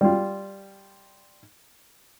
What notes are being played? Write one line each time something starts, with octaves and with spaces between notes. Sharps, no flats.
G3 F4